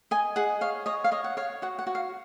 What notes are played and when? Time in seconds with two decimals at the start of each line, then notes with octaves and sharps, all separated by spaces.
0.11 D#5 G#5
0.36 G#4 F#5
0.61 C#5 F5
0.86 C#5 D#5
1.04 F5
1.12 C#5 D#5
1.24 F#5
1.37 C#5 F5
1.62 F#4 F#5
1.79 F#5
1.87 F#4
1.95 F5